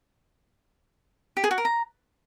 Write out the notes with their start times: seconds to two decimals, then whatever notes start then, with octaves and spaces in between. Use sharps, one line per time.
1.37 G4
1.44 G#4
1.51 F#4
1.58 A#4
1.65 A#5